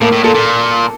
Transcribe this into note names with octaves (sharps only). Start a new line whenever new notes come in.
A2 A#3
A2
A#2 A4
A#2